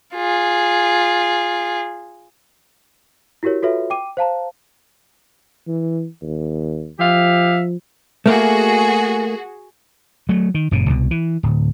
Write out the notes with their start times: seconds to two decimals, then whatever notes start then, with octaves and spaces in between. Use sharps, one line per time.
0.15 F4 G#4
3.43 E4 F#4 G4 A#4 C#5
3.62 F4 F#4 A4 B4 C#5 E5
3.90 G5 D6 D#7
4.17 C5 F5 A5 A#5
5.67 E3
6.22 D#2
6.99 F3 G4 E5 F5
8.26 A3 A#3 F#4 G#4
10.29 F#3 A3
10.54 D#3
10.71 F#1 A#2 C#3
10.90 C2 B2
11.11 E3
11.43 D1